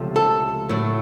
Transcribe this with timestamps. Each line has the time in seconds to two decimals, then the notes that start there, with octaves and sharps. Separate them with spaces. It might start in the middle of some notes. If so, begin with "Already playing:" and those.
Already playing: C#2 C3 F3 A3
0.16 A4
0.69 A2 F#3 A3